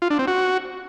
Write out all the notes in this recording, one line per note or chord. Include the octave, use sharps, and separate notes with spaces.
F4
D4
C4
F#4